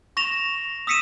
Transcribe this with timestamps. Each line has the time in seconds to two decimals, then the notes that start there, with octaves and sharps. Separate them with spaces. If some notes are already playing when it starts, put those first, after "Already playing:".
0.17 C#6 A#6 E7 F7
0.87 D#6 E6 B6 C#7 D#7 E7